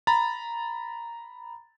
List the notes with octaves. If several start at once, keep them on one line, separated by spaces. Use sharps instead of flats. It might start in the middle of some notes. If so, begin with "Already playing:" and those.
A#5 B5 A6